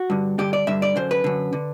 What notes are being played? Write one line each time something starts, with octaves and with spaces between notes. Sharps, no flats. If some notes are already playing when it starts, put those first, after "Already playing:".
Already playing: F#4
G2 D3
G2 D3 G4
D5
G2 D3 E5
D5
F#2 D3 C5
B4
F#2 D3
D3